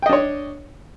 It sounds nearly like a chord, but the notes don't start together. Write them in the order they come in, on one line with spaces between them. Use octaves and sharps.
G5 D#5 D4 C#5